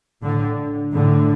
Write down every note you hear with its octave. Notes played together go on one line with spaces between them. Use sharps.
A2 D3
A2 D3